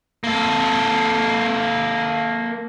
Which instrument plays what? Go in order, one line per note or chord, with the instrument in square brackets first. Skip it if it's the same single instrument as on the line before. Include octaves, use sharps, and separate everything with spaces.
[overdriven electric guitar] A#3 A4